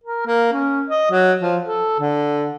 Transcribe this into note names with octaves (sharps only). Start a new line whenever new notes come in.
A#4
A#3
C#4
D#5
F#3
F3
A4
D3